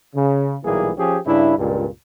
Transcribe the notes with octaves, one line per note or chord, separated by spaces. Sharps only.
C#3
B1 A#2 E3 G3 A#3 G#4
F3 C#4 G4 G#4
G2 C#3 D4 E4
C#2 G2 A#2